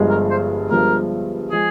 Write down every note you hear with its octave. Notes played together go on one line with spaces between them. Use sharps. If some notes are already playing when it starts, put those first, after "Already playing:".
Already playing: G1 G2 F3 G#3
A#4
C5
G1 G2 F3 G#3 A#4
F3 G#3 G#4